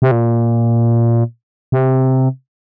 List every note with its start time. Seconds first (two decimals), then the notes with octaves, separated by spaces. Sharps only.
0.02 C3
0.11 A#2
1.72 C3